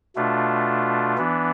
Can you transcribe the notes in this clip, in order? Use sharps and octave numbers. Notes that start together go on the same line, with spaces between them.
B2 A3 D4 F4
E3 B3 D4